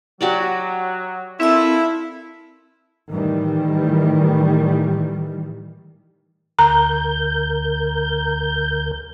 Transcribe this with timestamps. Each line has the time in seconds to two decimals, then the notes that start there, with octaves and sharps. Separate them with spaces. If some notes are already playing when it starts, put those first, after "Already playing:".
0.21 F#3 F#4 G4 D5
1.40 A#2 C4 E4 F4 A4 E6
3.11 A2 D#3 E3 G3
6.59 D2 A#4 A#5 G6